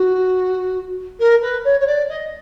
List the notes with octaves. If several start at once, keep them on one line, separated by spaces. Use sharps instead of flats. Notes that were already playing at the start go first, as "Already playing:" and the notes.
Already playing: F#4
A#4
B4
C#5
C#5
D5
D#5